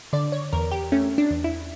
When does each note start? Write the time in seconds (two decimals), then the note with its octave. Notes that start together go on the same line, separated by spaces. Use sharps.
0.13 D3 D5
0.32 C#5
0.53 E2 A#4
0.71 G4
0.92 A3 C#4
1.18 D4
1.31 E2
1.44 E4